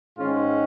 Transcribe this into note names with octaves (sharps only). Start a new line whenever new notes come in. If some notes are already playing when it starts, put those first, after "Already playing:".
G#2 D#3 G#3 C#4 F4